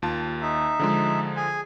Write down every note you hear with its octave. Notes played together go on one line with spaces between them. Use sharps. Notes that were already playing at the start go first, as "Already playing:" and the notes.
D#2 F4 A5
D#4 E5
D3 F3 G#3
G#4 G#5